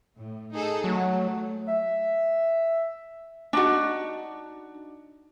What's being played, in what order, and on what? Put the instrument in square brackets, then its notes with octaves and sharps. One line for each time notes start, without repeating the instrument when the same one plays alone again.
[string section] A2
D#4 G#4 A4
[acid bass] F#3 [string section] A3
[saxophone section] E5
[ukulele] D4 D#4 F#4